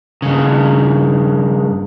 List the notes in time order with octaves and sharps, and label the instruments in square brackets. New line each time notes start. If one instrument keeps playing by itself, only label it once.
[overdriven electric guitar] G2 C#3